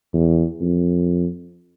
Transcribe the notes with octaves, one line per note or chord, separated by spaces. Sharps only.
E2
F2